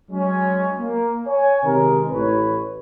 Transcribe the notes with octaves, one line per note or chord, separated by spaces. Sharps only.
F#3 G#3 C#4
A#3
C#5 G#5
C3 D#3 G#3 A#4
A1 B4 C#5